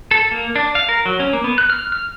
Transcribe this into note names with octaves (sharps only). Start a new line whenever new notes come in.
A4
A#3
D4
F5
A#4
F#3
C#4
A#3
B3
F#6
F6
F6